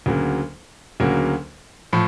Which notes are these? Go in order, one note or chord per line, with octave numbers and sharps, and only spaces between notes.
D2 C#3 F#3 A#3
D2 C#3 F#3 A#3
A2 F3